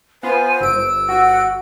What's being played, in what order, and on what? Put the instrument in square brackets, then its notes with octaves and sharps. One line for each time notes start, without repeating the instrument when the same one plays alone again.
[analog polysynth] B3 F4 [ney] C5 [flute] G#5
[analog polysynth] G1 D7 [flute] E6
[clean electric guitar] F#4 [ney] F#5